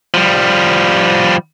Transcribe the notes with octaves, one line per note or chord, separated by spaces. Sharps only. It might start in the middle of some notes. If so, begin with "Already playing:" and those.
F3 G3